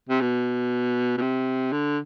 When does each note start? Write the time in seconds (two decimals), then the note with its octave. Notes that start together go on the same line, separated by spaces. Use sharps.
0.09 C3
0.21 B2
1.18 B2
1.21 C3
1.72 D3